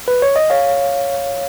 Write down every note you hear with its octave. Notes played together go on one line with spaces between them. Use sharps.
B4
C#5
D#5
C#5 F5